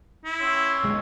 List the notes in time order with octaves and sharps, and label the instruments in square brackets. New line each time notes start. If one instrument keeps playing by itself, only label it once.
[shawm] E4
[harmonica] C#5 C6 E6
[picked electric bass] B1 G#3